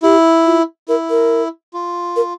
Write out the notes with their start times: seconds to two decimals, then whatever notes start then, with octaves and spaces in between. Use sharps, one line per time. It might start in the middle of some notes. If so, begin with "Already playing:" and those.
0.03 E4 G4
0.46 F4
0.89 E4 A#4
1.10 A#4
1.74 F4
2.16 A#4